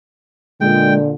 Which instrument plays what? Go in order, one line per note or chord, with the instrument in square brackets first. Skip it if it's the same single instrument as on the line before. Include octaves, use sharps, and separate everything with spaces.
[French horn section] A#2 D3 [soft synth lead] G#3 [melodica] G5